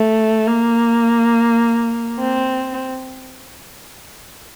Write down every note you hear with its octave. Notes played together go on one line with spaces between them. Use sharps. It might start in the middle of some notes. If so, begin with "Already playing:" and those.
Already playing: A3
A#3
C4